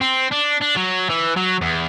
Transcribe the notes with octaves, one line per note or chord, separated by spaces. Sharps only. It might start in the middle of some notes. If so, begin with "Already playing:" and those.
C4
D4
D4
F#3
E3
F#3
E2